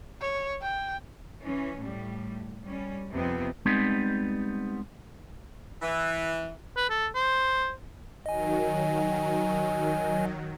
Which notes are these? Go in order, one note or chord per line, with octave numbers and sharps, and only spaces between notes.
C#5
G5
E3 C#4
A2 G3
G3 C#4
F2 C3 F3 B3 C4
G3 G#3 B3 C4 D#4
E3
B4
A4
C5
D#3 F#3 D#5 G#5